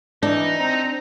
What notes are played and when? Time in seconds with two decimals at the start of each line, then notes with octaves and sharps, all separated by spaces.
0.23 E3 D4 D#4
0.60 C4 A#5